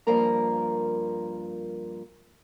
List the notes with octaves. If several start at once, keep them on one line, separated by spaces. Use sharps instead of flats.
G2 F3 A#3 A#4 A#5